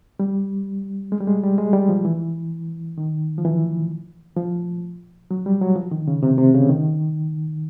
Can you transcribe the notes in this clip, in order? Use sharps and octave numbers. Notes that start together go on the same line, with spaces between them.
G3
G#3
G3
G#3
G3
G#3
G3
F3
E3
D#3
F3
E3
F3
F#3
G3
F#3
F3
D#3
C#3
C3
C3
C#3
D#3